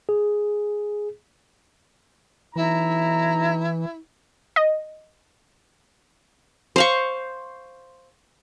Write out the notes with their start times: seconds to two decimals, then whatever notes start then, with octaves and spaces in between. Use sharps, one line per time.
0.09 G#4
2.56 B1 E3 D#4 E4 A#5
4.56 D#5
6.76 C5 F5 C#6